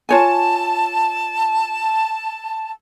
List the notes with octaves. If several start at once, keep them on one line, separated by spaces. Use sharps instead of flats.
F4 C#5 G#5 A5